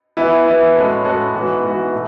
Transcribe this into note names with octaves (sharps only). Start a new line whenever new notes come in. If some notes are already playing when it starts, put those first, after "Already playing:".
E3 B3 E4
E3 B3 E4
A2 G#3 C#4 F#4 A4
A2 G#3 C#4 F#4 A4
G#2 E3 B3 F#4
G#2 E3 B3 F#4
B2 A3